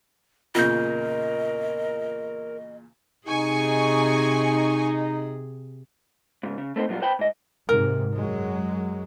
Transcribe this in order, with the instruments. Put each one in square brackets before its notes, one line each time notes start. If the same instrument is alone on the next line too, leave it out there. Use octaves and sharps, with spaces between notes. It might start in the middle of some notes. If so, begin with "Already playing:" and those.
[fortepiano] E2 A#2 C#3 [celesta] F4 G6 [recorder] A#4 [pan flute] D#5
[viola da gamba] C3 G#4 [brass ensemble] D#4 [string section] G#5 C#6
[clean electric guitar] G#2 C#3
C#3
A3 C4 D#4 C5
A#2 F#3 G3 F4
B4 C5 G5 A5 B5
G#2 D#5
[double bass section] G#2 C3 [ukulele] A#4
[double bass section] F#2 F#3 G#3